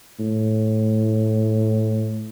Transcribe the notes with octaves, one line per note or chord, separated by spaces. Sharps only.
A2